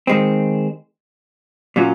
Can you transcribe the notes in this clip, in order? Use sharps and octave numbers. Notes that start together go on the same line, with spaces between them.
D#3 G#3 C4
A#2 F#3 C#4 F4